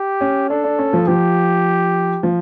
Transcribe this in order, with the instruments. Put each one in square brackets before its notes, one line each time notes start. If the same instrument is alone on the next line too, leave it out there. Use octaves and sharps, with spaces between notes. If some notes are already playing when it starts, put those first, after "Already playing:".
Already playing: [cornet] G4
[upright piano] C#4
[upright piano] D4 [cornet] A4
[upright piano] D4
C#4
F3
[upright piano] F3 [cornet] G4
[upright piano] F3